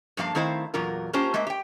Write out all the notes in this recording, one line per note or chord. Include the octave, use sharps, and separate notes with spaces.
G2 F3 A#3 F5 A5
D#3 A3 C4 E4 C5 F5
E2 A#2 F#3 F4 A#4
A#3 C#4 F4 G4 C5 A5
G#3 A#3 C5 E5
G4 G5